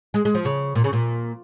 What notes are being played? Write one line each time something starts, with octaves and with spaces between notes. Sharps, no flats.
G#3
G#3
F3
C#3
A#2
C#3
A#2